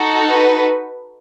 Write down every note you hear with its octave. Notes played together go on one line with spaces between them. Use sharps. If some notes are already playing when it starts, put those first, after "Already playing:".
Already playing: D#4 F#4 A4
B4